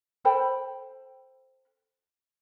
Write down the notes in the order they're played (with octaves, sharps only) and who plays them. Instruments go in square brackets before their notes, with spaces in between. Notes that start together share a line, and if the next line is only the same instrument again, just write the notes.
[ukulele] A4 C5 G5 B5